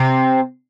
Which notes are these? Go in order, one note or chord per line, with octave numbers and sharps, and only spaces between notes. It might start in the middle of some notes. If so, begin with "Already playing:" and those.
Already playing: C3 C4